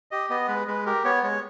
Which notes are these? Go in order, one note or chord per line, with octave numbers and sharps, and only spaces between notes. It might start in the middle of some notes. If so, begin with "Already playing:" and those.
G4 D#5
B3 D#5
G#3 B4
G#3 B4
G4 A#4
B3 C#5
G#3 C#5